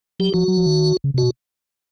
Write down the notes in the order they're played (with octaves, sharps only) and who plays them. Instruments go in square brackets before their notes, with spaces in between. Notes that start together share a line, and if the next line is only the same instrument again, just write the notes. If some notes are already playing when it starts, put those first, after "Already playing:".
[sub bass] F#3 [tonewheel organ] G4
[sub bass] F3 [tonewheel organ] F#4
[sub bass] F#3
F3
D#3
C#3
C3
[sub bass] B2 [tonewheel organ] F#4